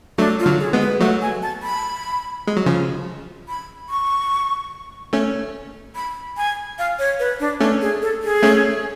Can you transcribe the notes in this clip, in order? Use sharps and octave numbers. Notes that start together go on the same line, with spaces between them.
F#3 A3 D4
F4
D3 F#3
G#4
G#3 B3
B4
F#3 A3 F#5
G#5
A5
B5
G#3
F#3
C#3 F3
B5
C#6
A3 C#4
B5
G#5
F5
C#5
B4
D4
A3 C#4 D4
G#4
A4
G#4
A3 C#4